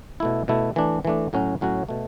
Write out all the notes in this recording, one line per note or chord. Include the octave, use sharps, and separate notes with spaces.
B2 A3 E4
B2 A3 E4
E3 A3 D4
E3 A3 D4
A2 F#3 C#4 F#4
A2 F#3 C#4 F#4
B2 A3